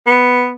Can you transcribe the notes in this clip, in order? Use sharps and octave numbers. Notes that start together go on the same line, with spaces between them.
B3